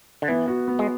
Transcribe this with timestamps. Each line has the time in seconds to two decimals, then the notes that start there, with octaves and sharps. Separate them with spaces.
0.22 D3
0.28 E3 B3
0.48 F#4
0.68 B3
0.79 G#3